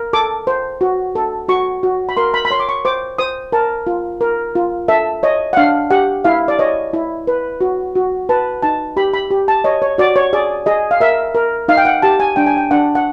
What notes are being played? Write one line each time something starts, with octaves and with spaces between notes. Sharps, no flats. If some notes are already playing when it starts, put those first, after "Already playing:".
Already playing: A#4
A4 D6
C5
F#4
A4
F#4 C#6
F#4
B5
A#4 C6
B5
B5
C#5 C6
D6
C#6
C5 D6
C5 D#6
A#4 A5
F4
A#4
F4
A4 E5
C#5 D#5
F#5
D4 F5
G4 F#5
E4 F5
D5
C#5 D#5
E4
B4
F#4
F#4
B4 A5
D#4 A5
G4 B5
B5
G4
A5
C#5 D#5
C#5
F#4 D5
C#5
G#4 D5
G#4 D#5
F5
A#4 E5
A#4
D#4 F5
G5
F#5
G4 A5
G#5
D4 G5
G#5
G5
D4 F#5
F#5